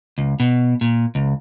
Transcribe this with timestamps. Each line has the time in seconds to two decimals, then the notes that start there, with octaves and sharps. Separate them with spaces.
0.18 C#2
0.40 B2
0.81 A#2
1.15 C#2